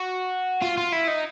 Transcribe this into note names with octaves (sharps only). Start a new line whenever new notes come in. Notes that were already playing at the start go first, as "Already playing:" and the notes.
Already playing: F#4
F4
F4
E4
D#4